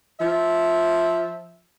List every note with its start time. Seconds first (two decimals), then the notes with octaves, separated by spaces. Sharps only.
0.20 F3 E5